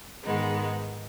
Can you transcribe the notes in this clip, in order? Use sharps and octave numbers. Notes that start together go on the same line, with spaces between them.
G#2 D#3 G#3 B3 D#4